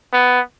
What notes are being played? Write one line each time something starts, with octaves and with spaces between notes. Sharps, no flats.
B3